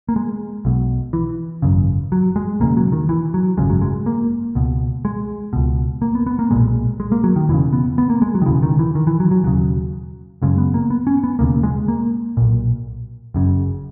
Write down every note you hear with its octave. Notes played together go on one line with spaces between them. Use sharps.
A#3
G#3
B1 B2
E3
G#1 F#2 C#3
F#3
G#3
E1 E2 C#3 A#3
F#3
D#3
E3
F#3
G#1 F#2 C#3 G#3
F#3
G#3
A#3
C#2 B2
G#3
C#2 B2
A#3
B3
B3
A#3
B1 A#2 G#3
G#3
A#3
F#3
D#3
E1 E2 C#3 E3
B3
B3
A#3
G#3
F#3
D#3
E1 D#2 C#3 E3
D#3
E3
D#3
E3
F#3
F#3
E1 D#2 C#3 F#3
F#1 F#2 C#3 G#3
B3
A#3
B3
C#4
B3
E1 D#2 C#3 A#3
G#3
A#3
B1 A#2
F#1 F#2 C#3